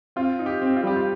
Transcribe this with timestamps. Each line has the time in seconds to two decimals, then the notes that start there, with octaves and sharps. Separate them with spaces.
0.16 C4 F4
0.39 D#4
0.46 G4
0.61 C4
0.76 F4
0.83 G3 G4
0.96 F4